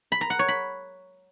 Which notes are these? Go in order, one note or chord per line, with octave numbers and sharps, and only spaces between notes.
B5
A#5
F#5
C#5
B5